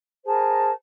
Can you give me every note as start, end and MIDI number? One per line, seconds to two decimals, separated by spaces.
0.25 0.70 68
0.25 0.70 70
0.25 0.70 72
0.25 0.70 81